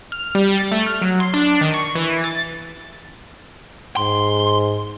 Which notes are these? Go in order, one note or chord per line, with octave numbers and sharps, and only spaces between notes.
F6
G3
A6
A3
F6
F#3
C6
D4
D#3
C#6
E3
A6
G#2 C6